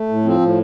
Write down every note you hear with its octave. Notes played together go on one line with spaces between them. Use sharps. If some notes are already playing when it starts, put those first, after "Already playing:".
Already playing: A3
A2
F3 C4
A2